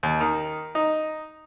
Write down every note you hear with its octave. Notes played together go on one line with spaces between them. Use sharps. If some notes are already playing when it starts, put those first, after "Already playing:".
D#2
D#3
D#4